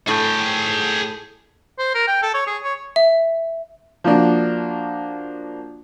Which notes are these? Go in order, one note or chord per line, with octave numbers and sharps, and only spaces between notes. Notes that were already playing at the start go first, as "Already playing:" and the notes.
A2 G#4 G5
C5
A#4
G5
A4
C#5
G#4
C#5
E5
F3 A#3 D4 F#4